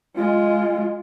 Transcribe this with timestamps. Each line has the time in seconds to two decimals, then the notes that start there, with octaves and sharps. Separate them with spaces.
0.17 G#3 F4